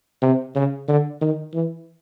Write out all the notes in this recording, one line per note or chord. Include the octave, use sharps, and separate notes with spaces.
C3
C#3
D3
D#3
E3